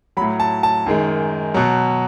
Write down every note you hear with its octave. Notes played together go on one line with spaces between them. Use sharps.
F#3 B5
A2
A5
A5
F#2 D#3 G#3
B2 F#3